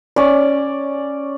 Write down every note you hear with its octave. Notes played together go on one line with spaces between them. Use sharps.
C#4 D5